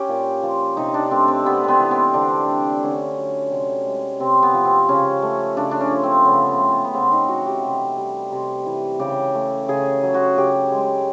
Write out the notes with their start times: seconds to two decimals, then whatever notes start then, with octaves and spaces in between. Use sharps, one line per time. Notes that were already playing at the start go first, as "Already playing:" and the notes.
Already playing: C#4 G4
0.09 A#2
0.43 F3
0.77 C3 D#4
0.94 D4
1.11 A3 C4
1.28 C4
1.45 C3 B3
1.64 B3 C4
1.80 E3
1.91 C4
2.14 D3 D4
2.48 A3
2.83 D3 C#4
3.17 F#3
3.51 C3
3.86 G#3
4.20 C3 C4
4.43 B3
4.54 F3
4.65 C4
4.89 C#3 C#4
5.22 A3
5.57 C#3 D4
5.71 D4
5.80 C#4
5.91 F3
6.03 C4
6.25 C#3 B3
6.48 C4
6.59 A3
6.71 B3
6.85 B3
6.94 C#3 C4
7.12 D#4
7.28 E3 F#4
7.46 G4
7.63 C3
7.98 G3
8.32 C3
8.66 E3
8.99 C#3 G4
9.35 A3
9.68 C#3 G#4
10.03 F#3
10.14 F#4
10.37 C#3 G4
10.72 G#3